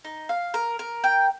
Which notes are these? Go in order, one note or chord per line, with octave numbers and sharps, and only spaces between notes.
D#4
F5
A#4
A#4
G5